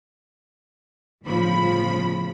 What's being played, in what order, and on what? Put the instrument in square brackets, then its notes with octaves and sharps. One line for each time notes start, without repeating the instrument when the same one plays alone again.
[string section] G1 A2 C#3 F3 B5